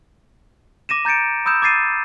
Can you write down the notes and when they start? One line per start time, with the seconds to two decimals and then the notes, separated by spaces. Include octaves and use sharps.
0.89 D6 A#6 D#7 E7
1.05 A#5 G6 A6 C#7 D7
1.46 B5 D#6 E6 G6 E7
1.62 D6 G#6 A6 C7 D#7